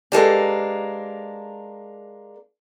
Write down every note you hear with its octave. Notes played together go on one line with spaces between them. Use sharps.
G#3 A#3 D4 G4 A4 B4